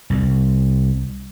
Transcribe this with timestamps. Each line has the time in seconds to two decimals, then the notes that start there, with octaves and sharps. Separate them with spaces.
0.10 C2